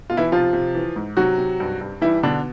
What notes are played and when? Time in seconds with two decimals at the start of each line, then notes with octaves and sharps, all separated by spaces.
0.10 B2 F4
0.17 E3 E4
0.32 C3 F3 F4
0.53 C3
0.75 E3
0.96 G#2
1.17 C3 F#3 F#4
1.38 C3
1.60 G2
1.81 G2
2.02 E3 G3 E4
2.23 B2 D3 D4